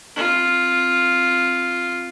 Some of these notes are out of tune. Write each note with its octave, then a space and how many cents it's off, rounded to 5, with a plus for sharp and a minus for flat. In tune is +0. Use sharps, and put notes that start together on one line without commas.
C4 +0 F4 +0